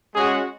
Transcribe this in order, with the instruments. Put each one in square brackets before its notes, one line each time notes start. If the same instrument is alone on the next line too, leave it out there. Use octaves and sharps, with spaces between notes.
[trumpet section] G#3 C#4 F#4 G#4